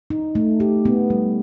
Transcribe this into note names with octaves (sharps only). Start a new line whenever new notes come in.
D#4
A3
G4
B3
G3